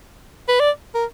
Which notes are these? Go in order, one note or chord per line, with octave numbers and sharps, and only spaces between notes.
B4
D5
A#4